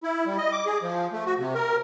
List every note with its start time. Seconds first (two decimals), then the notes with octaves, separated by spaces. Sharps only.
0.03 E4
0.26 G3
0.38 D#5
0.52 D6
0.66 G#4
0.82 F3
1.13 A3
1.26 F#4
1.39 C3
1.55 A#4